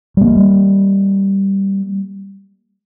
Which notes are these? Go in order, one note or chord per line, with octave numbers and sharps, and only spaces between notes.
G3 A#3